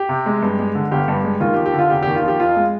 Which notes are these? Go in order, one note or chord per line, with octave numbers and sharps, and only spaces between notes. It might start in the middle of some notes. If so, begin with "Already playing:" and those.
Already playing: G4
C3
G#3
G2
G#3
D3
G1 G4
G2
G#3
D#2 F4
G4
F3
G4
D3
F4
F1 G4
D#2 G4
F4
F3 G4
F2 F4
G#3